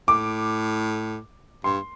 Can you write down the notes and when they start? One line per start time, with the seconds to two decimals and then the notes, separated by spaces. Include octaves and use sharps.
0.08 A2 D6
1.64 G2 C6